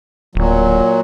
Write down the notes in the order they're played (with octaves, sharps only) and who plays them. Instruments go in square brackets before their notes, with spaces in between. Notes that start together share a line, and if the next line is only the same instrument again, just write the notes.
[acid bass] D1 [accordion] A#2 F#3